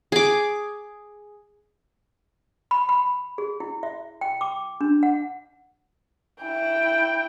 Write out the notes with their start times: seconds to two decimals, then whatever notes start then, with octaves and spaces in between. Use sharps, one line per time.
0.12 G#4 D6
2.71 B5
2.89 B5
3.38 G#4
3.60 E4
3.83 E5
4.21 G5
4.41 D6
4.81 D4
5.03 F#5
6.43 E4 G5